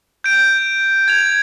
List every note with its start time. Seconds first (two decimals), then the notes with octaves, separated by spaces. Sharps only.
0.24 G6 D7
1.08 G#6 F7